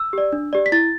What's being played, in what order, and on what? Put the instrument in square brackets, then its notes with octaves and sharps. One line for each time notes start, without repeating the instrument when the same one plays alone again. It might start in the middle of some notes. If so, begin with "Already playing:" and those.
Already playing: [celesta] E6
G4 D5
D4
G4 D5
B6
E4 A6